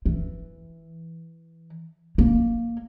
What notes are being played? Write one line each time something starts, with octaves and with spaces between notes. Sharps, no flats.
E3
A#3